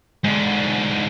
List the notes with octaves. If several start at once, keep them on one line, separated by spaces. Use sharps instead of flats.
G#2 D3